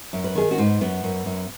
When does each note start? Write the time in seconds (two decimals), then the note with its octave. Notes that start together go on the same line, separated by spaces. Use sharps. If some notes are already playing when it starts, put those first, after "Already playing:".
0.13 F#2
0.24 B4
0.35 D#3 G#4
0.51 C#4 F#4
0.58 G#2
0.66 B3
0.81 F#2 B3
1.04 F#2
1.26 F#2